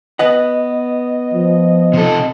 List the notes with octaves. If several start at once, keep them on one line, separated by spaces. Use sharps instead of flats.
B3 B4 D#5 F#5
F3
C3 A4